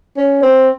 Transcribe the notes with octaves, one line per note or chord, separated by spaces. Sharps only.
C#4
C4